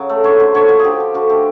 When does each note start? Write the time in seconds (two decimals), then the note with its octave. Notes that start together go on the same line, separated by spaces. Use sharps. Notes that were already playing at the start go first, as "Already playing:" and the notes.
Already playing: C#3 F#3
0.09 A3
0.24 D3 C#5
0.40 D3 C5
0.54 D3 C#5
0.69 F3 C5
0.79 D3 G4 G#4
1.00 F3
1.14 D3 F#4
1.29 A3 G4